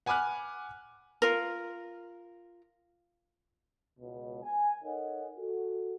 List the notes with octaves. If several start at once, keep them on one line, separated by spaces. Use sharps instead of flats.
F#5 G#5 B5 D6 F6 F#6
F4 A#4
C#2 B2
G#5
D#4 A4 A#4 C#5 D#5 F#5
F#4 A4